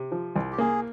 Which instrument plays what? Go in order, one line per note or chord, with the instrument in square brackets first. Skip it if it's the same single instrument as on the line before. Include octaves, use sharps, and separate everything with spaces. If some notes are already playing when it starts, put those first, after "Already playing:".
Already playing: [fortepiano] C3
F3
C2
[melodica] G4
[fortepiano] A#3 [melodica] G#4